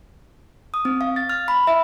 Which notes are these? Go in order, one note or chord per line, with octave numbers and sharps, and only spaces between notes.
D#6
C4
F5
A6
F6
B5
E5